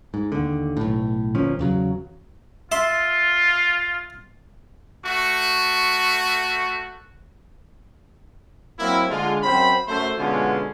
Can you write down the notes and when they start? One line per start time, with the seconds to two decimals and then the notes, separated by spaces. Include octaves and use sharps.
0.14 G#2
0.32 D#2 D3
0.77 B1 A2
1.35 G1 A#2 F3 C#4
1.59 E2 C#3 F#3
2.72 F4 E5 C6
5.06 A3 F#4 C#6
8.79 F#3 A#3 C4 E4
9.09 D3 G#3 F4
9.43 F#2 C4 C5 G5 B5
9.87 F#2 A3 C5
10.18 B2 D3 G#3 B3 C#4 F4